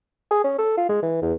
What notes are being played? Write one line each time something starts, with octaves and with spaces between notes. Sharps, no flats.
G#4
C#4
A4
F4
G#3
E3
E2